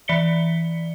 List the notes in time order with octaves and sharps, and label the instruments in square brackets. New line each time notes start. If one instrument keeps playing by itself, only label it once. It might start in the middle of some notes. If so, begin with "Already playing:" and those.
[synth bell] E3 D5 B6 C#7 G7